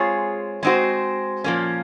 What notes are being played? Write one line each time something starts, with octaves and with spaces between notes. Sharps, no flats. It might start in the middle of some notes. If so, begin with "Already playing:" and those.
Already playing: G#3 C4 F4 G#4 C#5
G#3 C4 D#4 F#4 C5
A#2 F3 A#3 C#4